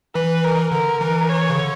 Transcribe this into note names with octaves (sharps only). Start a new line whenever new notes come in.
E3 B4
A#4
D3 A#4
E3
C#5
C#3
D3